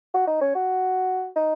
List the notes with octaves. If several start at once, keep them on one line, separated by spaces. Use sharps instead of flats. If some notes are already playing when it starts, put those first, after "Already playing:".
F#4
D#4
C#4
F#4
D#4